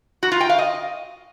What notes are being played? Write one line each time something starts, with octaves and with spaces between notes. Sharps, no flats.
F#4
F4
G5
F5
D#5